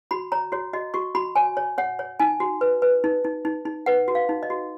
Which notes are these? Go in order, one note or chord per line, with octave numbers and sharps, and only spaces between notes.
F#4 B5
C#5 A#5
F#4 C#5
F#4 D#5
F#4 C#6
F#4 B5
C#5 G#5
C#5
C#5 F#5
C#5
D#4 G#5
F#4
B4
B4
D#4
D#4
D#4
D#4
B4 F#5
F#4
F5
D#4
D#5
F#4